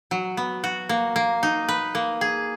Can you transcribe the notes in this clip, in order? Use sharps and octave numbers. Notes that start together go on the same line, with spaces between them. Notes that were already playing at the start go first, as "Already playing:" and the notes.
F#3
B3
F#4
A#3
A#3
D#4
B4
A#3
G#4